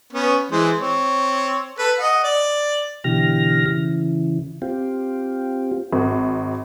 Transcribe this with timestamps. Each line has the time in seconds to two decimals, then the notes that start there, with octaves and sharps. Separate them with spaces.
0.13 B3 C#4
0.51 E3 G#3 C5
0.80 C4 C#5
1.79 A4 B4
1.98 D#5 F#5
2.24 D5
3.04 B2 D3 E3 G4 F6 A#6
3.66 C#3 E3
4.62 C4 F4 G4
5.93 G#1